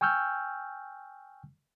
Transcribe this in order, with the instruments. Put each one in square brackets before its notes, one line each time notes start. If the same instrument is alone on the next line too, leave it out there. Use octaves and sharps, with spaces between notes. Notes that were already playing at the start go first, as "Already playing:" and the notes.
[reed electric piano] G5 G#5 C#6 E6 F6 G6